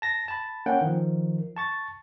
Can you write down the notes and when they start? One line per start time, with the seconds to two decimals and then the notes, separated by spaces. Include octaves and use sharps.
0.02 A5 A#6
0.28 A5 B5
0.66 A#3 C#4 F#5 G5
0.81 D#3 F3
1.57 A5 C#6 A6